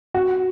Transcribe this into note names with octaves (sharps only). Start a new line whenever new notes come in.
F#4